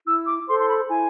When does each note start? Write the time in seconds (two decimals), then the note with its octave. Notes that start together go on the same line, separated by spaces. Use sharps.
0.06 E4 E6
0.27 D6
0.47 A4 C5 C6
0.59 C6
0.69 B5
0.89 E4 G#5